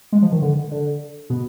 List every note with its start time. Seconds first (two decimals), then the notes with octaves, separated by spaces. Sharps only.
0.12 G#3
0.22 F3
0.32 D#3
0.42 D3
0.71 D3
1.30 B2